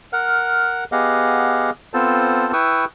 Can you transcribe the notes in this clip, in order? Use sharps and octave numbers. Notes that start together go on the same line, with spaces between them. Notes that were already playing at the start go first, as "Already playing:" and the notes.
A#4 F#5 F6
B3 G4 G#4 D#5 F5 F#5
B3 C4 F4 A4 C5 A5
E4 B4 G5 C#6 D#6 E6